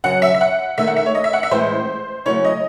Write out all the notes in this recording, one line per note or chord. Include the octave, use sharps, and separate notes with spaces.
F#2 C#3 F#3 F#5
E5
E5
F#5
D#2 D#3 A3 E5
F#5
E5
C#5
D#5
E5
F#5
E5
A2 E3 G#3 C#4 E4 C5
C#3 F#3 A3 C#4 E4 C#5
D#5